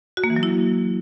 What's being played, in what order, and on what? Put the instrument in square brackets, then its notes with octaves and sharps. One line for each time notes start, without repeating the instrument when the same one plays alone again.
[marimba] F#4
A#3
E3
F#3
E4